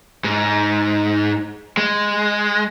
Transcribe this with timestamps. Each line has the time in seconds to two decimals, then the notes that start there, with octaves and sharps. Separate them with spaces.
0.24 G#2
1.77 G#3